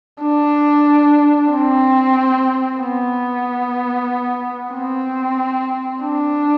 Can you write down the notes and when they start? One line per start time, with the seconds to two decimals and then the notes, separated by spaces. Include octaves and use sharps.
0.22 D4
1.52 C4
2.81 B3
4.75 C4
6.03 D4